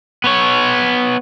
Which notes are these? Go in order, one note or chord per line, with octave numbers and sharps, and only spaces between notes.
B3 C#5